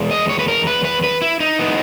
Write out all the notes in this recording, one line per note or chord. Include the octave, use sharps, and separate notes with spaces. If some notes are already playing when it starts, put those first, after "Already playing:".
Already playing: E2 G#3 B3
D#5
C#5
B4
A#4
B4
B4
B4
E4
D#4
E3 G#3 B3